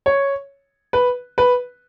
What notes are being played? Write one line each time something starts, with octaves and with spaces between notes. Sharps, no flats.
C#5
B4
B4